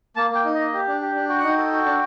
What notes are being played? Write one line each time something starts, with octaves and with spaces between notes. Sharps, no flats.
A#3 A5
A#3 G5
D#4
A#3 D#5
G4
D4
G4
D4
F#4 G5
F#5
D#4 G5
A4
F#4
D4